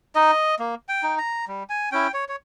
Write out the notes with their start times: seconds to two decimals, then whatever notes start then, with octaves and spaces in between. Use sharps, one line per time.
0.15 D#4 D#5
0.59 A#3
0.89 G5
1.03 D#4
1.18 A#5
1.48 G3
1.69 G#5
1.92 C#4 E4 G5
2.14 C#5
2.29 C#5